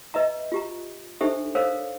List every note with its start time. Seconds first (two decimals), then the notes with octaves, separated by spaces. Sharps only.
0.14 B4 D#5 E5 A#5
0.52 F4 G4 A#5
1.21 D4 D#4 G4 A4 C5 E5
1.55 A4 A#4 C5 C#5 F5